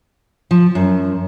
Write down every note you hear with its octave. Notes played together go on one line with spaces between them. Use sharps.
F3
F#2